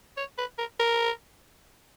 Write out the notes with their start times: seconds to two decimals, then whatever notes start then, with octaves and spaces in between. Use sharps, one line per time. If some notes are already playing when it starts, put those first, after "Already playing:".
0.17 C#5
0.38 B4
0.58 A#4
0.80 A#4